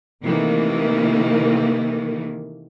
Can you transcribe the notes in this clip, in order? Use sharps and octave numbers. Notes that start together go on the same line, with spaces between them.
C3 D#3 E3 A3 A#3